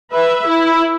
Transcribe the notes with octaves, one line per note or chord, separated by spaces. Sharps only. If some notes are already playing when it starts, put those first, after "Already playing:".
B4 E5
E4